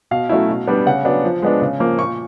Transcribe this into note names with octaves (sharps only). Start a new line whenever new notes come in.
B2 F5
F#3 A3 C#4 E4
B2
G3 B3 D4
C#3 F#5
F#3 B3 D4
F3
G#3 B3 D4
C#3
F3 A#3
A#2 C#6